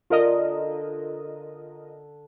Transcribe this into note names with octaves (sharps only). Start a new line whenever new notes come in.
D3 F4 A#4 D#5